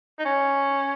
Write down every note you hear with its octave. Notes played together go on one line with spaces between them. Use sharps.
D#4
C#4